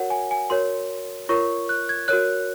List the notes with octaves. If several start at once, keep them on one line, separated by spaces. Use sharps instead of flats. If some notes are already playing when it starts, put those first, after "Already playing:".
Already playing: F#4 A#4 C#5 F#5
G#5
G#5
F#4 A#4 C#5 C6
F4 A#4 C#5 C#6
F#6
G#6
F#4 A#4 C#5 F#6